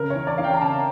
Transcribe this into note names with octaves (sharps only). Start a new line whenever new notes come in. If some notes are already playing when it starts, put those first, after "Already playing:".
Already playing: C#3 A#4
C#5
E3
D5
E3 F5
G5
A#5
C#3 A5